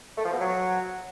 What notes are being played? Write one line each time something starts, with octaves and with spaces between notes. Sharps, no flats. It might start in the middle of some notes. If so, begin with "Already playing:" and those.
A3
F3
B2
F#3